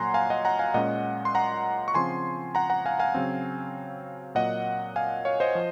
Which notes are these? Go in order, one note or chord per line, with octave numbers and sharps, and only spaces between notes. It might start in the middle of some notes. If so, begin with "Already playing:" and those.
Already playing: A#2 F#3 A#3 F#5 G#5 A#5 C6
F5 G#5
D#5 F#5
F#5 A#5
F5 G#5
A#2 G#3 C#4 D#5 F#5
C6
F#5 A#5
C#6
C#3 F3 C4 G#5 C6
F#5 A#5
F#5 A#5
F5 G#5
F5 G#5
C#3 F#3 C4
A#2 F#3 A#3 D#5 F#5
F5 G#5
C#5 F5
C5 D#5
F3